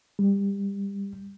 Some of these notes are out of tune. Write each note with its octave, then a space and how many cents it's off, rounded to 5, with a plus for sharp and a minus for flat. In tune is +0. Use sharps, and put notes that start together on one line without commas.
G3 +25